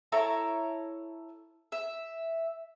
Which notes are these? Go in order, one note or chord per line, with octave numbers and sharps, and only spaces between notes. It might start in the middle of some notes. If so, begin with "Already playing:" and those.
E4 A4 C#5 A#5
E5